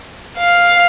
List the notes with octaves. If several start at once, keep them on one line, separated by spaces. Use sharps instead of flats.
F5